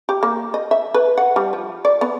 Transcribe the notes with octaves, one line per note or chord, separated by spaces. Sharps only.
G4
A#3
D#5
E5
B4
F#5
G3
F3
D5
B3